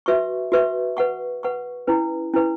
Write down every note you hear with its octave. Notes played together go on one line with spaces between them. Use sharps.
F#4 B4 E5 C#6
F#4 B4 E5 C#6
B4 F#5 C#6
B4 F#5 C#6
C#4 E4 B4
C#4 E4 B4